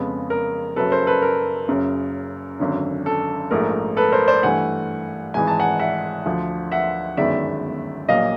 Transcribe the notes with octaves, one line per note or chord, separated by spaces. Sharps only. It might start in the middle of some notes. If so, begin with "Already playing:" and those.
Already playing: F2 C#3 F3 G#3 B3
A#4
F#1 F#2 C#3 F#3 A4 B4
A#4 C5
A4 B4
A#4
F#1 F#2 C#3
G#1 F#2 D3
A4
A#1 G#2 F3 A3 A#4
A4 B4
A#4 C5
C5 D5
G2 E3 A3 F#5 G#5
G#1 G#2 E3 G#5
A5
F#5 G#5
E5 F#5
D2 D3 F3
E5 F#5
G1 F#2 D#3 G#3 B3 D5 E5
A#1 A#2 F#3 A#3 D#5 F5